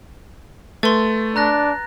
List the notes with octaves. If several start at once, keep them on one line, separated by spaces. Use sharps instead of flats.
A3 B4 C6 A6
D4 A#5 F#6 A#6